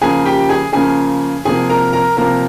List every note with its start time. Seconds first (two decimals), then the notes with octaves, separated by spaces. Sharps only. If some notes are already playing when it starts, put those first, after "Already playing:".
0.01 C#3 F3 A#3 G#4 G#5
0.25 G4 G5
0.49 G#4 G#5
0.73 C#3 F3 A#3 G#4 G#5
1.45 C3 F3 A#3 G#4 G#5
1.70 A#4 A#5
1.93 A#4 A#5
2.17 C3 F3 A#3 A#4 A#5